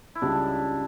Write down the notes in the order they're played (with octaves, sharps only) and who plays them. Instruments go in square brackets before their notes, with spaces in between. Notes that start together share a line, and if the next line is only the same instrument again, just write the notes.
[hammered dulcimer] E4
[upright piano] C#2 C#3 G3 [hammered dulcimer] D4